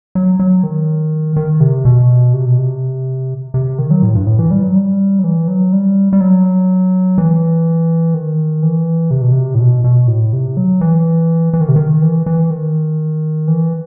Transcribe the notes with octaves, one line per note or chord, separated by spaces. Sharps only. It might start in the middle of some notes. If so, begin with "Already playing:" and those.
F#3
F#3
D#3
D#3
C3
B2
C3
B2
C3
C3
D#3
F#3
A2
G2
A2
E3
G3
F#3
G3
F#3
E3
F#3
G3
G3
F#3
E3
D#3
E3
C3
B2
C3
A2
B2
B2
A2
C3
F#3
E3
E3
D#3
C3
D#3
E3
E3
D#3
E3